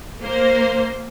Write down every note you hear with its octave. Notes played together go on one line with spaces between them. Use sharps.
A#3 C5